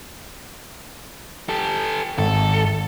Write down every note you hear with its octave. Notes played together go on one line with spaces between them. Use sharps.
G4 A4
G#1 A4